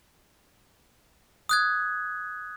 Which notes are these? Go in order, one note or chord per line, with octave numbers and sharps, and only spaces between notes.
D#6 F#6 G#6